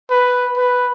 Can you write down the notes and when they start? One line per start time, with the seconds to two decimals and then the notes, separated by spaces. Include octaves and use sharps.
0.10 B4
0.57 B4